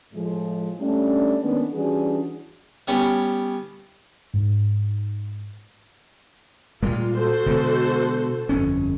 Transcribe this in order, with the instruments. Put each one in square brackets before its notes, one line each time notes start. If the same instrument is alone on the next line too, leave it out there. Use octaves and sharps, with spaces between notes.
[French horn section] A2 F3 G#3
G3 A3 C#4 D4
D#3 G#3 A#3 B3 C#4 D4
E3 G3 C#4 D4 F#4 G#4
[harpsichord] G3 B3 C#4
[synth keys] G#2
[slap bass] A#2 G3 G#3 [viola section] F4
[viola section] F#4 A4 C5
[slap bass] B2 D3 G#3
G1 F2 C#4